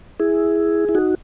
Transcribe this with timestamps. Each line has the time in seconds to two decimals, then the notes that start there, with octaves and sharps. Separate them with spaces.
0.20 E4 G#4
0.89 E4
0.95 D#4 F#4